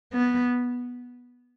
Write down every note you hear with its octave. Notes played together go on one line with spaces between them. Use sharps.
B3